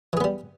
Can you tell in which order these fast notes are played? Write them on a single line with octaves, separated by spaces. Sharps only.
E3 G#4 B3 G3